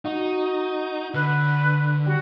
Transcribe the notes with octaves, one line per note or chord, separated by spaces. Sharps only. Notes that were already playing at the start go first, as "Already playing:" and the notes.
D#4 F#4
D3 B4
G3 F#4